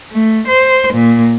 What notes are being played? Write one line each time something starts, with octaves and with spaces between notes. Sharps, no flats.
A3
C5
A#2